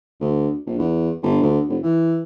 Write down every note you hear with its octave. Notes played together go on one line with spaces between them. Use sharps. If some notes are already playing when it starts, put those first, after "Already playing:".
D2
A#1
E2
G1
D2
F1
E3